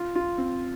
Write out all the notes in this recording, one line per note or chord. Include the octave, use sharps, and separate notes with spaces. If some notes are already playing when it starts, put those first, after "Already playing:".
Already playing: F4
F4
C4